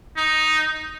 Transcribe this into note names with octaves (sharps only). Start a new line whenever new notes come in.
D#4